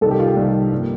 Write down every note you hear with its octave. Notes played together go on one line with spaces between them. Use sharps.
C2 C3 D#3 A4
G4
F4
G4
C2 C3 D#3
G2 F3 A#3